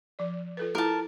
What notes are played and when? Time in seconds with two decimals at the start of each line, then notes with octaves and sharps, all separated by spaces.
0.19 F3 D5
0.57 F4 A4 B4
0.75 E4 F4 A4 A#4 A5